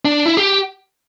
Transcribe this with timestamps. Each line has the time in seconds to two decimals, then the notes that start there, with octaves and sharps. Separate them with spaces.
0.05 D4
0.26 E4
0.37 G4